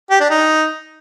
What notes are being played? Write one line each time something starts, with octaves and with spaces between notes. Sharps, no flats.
G4
D4
D#4